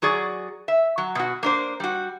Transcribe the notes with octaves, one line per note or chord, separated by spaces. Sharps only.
F#3 F#4 G#4 D5
E5
F#3
B2 F#4
A#3 D4 C5
G3 F#4